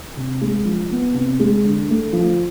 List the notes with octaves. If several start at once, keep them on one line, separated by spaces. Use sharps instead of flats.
C3
G#3
F3
B3
C3
G#3
D3
A3
F3